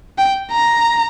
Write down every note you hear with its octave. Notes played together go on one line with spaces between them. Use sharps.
G5
A#5